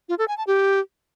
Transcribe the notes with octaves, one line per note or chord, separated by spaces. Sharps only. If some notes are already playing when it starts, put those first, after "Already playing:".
F4
A4
G#5
A5
G4